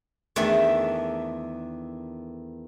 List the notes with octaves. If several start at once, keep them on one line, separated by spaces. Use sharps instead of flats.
E2 D#3 A3 D4 E5